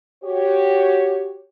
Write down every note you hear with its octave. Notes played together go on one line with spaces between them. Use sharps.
F#4 G4 C#5